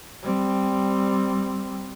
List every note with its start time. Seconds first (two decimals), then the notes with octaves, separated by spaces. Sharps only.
0.23 G3 C4